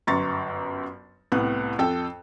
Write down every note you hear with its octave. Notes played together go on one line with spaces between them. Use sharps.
G1 F#2 A#5 C6 C#6 A6
C2 A2 B3 F#6
F2 A4 G5